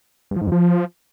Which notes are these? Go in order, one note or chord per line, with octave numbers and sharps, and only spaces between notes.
G2
F3
G#2
F2
F3